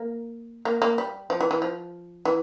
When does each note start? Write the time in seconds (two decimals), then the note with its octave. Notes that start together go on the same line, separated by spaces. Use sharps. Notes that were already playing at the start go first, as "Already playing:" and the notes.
Already playing: A#3
0.65 A#3
0.82 A#3
0.98 G3
1.30 F3
1.41 E3
1.51 E3
1.62 F3
2.25 E3